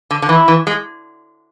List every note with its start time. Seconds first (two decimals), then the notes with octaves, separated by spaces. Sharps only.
0.11 D3
0.22 D3
0.29 E3 E4
0.48 E3
0.67 G#3